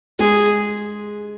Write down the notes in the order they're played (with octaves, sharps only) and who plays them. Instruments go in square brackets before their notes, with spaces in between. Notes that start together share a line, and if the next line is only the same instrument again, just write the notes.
[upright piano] G#3 [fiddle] G#4